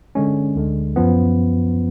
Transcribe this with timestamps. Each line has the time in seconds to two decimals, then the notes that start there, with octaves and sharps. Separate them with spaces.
0.15 D3 G#3 C#4
0.55 D2 D3 G#3
0.96 F#2 F3 B3